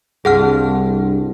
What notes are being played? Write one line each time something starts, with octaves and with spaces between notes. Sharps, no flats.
C2 G2 F4 G#4 F#5 F6